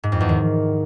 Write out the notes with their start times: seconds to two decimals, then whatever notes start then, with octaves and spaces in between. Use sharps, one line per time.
0.03 G#2
0.12 F2
0.20 E2
0.29 D#3